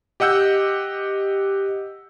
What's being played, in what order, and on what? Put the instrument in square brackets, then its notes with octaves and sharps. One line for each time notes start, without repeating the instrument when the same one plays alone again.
[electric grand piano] G4 D#5 F#5 E6 G6